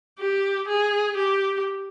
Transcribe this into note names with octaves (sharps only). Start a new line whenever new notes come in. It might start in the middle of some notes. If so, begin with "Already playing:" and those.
G4
G#4
G4